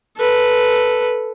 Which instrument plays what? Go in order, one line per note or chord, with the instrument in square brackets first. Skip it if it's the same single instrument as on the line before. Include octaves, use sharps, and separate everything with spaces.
[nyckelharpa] A4 B4